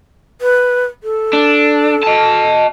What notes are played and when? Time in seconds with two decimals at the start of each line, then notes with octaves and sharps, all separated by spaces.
0.41 B4
1.03 A4
1.33 D4
2.03 D#5 A5